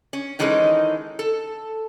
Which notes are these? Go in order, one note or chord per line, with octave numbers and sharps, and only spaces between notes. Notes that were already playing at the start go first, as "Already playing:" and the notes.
C#4
D#3 E3 G#3 C#4 D#4 A4
A4